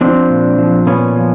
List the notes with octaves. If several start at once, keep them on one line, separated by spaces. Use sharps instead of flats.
F3 C4 D4
A#2
F3
A#2 B3 C#4
F3